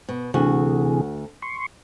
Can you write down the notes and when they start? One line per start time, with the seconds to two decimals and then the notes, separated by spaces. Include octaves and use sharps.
0.09 B2
0.34 D2 C3 E3 F#4 G#4
1.42 C6 C#6